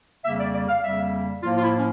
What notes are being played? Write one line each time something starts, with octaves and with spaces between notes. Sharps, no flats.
F2 C#3 G3 A#3 E5
D5
D5
F5
F2 C#3 G3 A#3 E5
A2 F3 A#3 F4
F4
E4
C#4